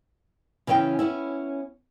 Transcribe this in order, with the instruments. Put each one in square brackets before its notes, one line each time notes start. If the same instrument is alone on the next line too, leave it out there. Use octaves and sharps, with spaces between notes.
[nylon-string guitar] C#3 E3 C#4 C5 G5
B3 C#4 E4